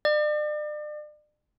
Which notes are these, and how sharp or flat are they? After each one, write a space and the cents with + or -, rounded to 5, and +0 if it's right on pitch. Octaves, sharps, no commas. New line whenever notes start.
D5 +40